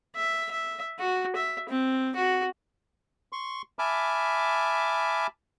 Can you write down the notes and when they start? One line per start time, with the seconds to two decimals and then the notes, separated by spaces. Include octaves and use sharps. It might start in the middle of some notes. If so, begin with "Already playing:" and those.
0.15 E5
0.51 E5
0.99 F#4
1.36 E5
1.69 C4
2.16 F#4
3.32 C6 C#6
3.79 E5 G#5 A5 B5 D6 F6